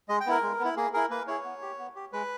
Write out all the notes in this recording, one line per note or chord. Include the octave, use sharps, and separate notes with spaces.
G#3 D#5
G5
B3 E4 A#4
G#3
B3
E4
A#3 G#4
E4 G#4 A#4
A#3 B4
E4 G#4 C#5
B3
G4
B3
G4
G#3 B4